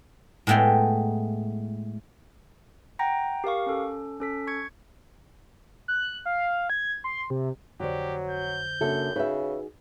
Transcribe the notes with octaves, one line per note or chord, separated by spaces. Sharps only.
A2 G#3 A3 B3 G5
F#5 G5 A#5 A#6
G4 A#4 F5 C#6
C#4 A4
C#4 A4 B6
C#6 G#6 C#7
F#6
F5
G#6
C6
C3
F2 D3 F#3 F#4 G4 C5 D5
G6
F#2 C#3 A#3 D4 F#4 A4 E5
C#3 D#4 F#4 G#4 B4 E5